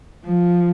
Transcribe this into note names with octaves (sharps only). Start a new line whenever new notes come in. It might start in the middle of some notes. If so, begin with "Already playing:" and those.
F3